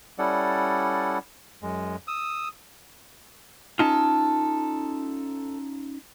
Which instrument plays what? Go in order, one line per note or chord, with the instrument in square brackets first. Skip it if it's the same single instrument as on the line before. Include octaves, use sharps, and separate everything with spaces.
[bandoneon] G3 C#4 E4 A4 D5 F#5
F#2 G#3
D#6 E6
[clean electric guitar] C#4 D#4 F4 [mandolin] A4